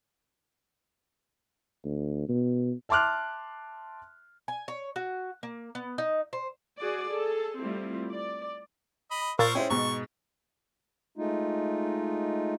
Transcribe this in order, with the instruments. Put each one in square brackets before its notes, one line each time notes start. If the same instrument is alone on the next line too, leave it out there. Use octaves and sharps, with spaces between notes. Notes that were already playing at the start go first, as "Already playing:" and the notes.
[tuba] D2
B2
[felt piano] E5 A5 C6 D6 F6 F#6
[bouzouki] G#5
C#5
F#4
A#3
B3
D#4
C5
[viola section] F#4 G#4 D5
G#4 A4
G3 A3 C4 E4 F4
D5
[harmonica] D#5 B5
[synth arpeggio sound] A#2 [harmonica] A#4 C5 C#6 [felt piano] E6 A6
[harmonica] G#3 [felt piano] C#4 E4 C5 [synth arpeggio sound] G5
[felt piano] G#2 B2 [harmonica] C#6
[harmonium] G#3 A3 D#4 F4